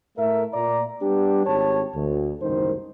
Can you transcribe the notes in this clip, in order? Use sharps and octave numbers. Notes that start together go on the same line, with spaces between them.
A2 A3 A#4 E5
A#2 D5 A#5
G3 B3 D4 G4
G#1 G4 C#5 A5
D2
F#1 C2 G#2 D#3 C5